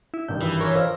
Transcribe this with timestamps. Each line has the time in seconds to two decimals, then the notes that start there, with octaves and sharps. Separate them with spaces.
0.14 E4
0.28 G#1 G2 D#3 G6
0.42 E3
0.60 C#4 A#4 C#5
0.75 F3 A#4 C5 E6